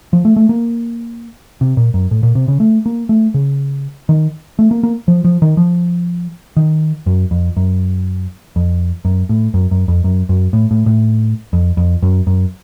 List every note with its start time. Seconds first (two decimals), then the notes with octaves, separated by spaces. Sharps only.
0.13 F3
0.25 A3
0.36 A3
0.49 A#3
1.61 C3
1.77 A#2
1.94 F#2
2.11 A2
2.23 A#2
2.35 C3
2.48 C#3
2.60 A3
2.86 A#3
3.09 A3
3.34 C#3
4.09 D#3
4.59 A3
4.71 A#3
4.83 A#3
5.08 F3
5.24 F3
5.42 D#3
5.57 F3
6.57 D#3
7.06 F#2
7.31 F2
7.57 F#2
8.56 F2
9.05 F#2
9.29 A2
9.54 F#2
9.71 F#2
9.88 F2
10.04 F#2
10.29 F#2
10.53 A2
10.71 A2
10.86 A2
11.53 F2
11.77 F2
12.03 F#2
12.27 F#2